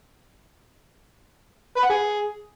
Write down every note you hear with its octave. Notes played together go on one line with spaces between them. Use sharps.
B4
F#5
G#4